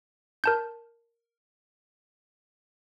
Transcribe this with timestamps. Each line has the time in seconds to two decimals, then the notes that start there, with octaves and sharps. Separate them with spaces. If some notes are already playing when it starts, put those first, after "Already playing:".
0.44 A#4 A5 G6